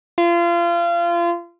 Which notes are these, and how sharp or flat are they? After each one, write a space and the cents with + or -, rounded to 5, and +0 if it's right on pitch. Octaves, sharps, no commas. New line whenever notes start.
F4 -30